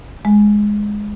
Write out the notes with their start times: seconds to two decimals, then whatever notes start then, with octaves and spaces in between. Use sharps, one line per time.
0.25 G#3